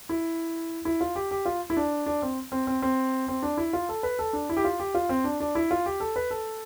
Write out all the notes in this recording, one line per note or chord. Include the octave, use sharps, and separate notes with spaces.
E4
E4
F4
G4
G4
F4
E4
D4
D4
C4
C4
C4
C4
C4
D4
E4
F4
A4
B4
A4
D4
E4
G4
F4
G4
F4
C4
D4
D4
E4
F4
G4
A4
B4
A4